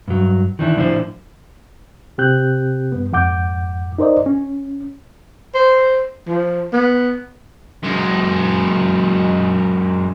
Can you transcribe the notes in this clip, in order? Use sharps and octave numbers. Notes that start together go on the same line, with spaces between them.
G2 F#3
D#3 E3 D4 E4
A2 F3 D4 E4 C5
C3 C4 G4 F#6 G6
G2 B3
F2 G#2 F#5 D6 G6
D#4 A#4 C5 D5 D#5
C#4
C5
F3
B3
F#2 G#3